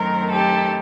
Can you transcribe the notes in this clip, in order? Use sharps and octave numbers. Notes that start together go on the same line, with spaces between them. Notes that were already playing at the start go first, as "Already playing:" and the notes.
Already playing: F#2 D#3 F#3 A3 C4 A#4
G4 A4